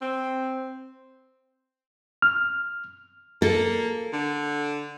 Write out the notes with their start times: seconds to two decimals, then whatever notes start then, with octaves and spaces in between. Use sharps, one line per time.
0.02 C4
2.22 F6
3.42 A#3 A4
4.13 D3